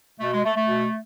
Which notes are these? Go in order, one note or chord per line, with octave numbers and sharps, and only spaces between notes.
B2 A3
G#3
A3
A3
B2